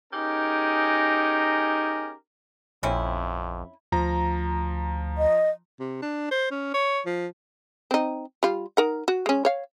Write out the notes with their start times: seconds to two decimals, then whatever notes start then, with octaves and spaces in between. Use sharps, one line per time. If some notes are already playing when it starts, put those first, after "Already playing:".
0.13 C#4 D#4 G4 G#4 A#4
2.83 A#1 F2 C4 C#4 E4
3.92 D2 F3 A#5
5.18 D#5
5.80 C3
6.02 D4
6.31 C5
6.51 C#4
6.74 C#5
7.06 F3
7.91 C4 D#4
8.43 G3 F4
8.77 D#4 A#4 F#5
9.08 F#4
9.26 G#3 C#4
9.45 C#5 F5